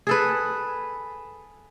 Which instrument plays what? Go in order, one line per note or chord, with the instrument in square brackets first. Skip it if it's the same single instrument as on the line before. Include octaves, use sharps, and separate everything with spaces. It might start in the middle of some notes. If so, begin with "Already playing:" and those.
[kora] G#4 A4 B4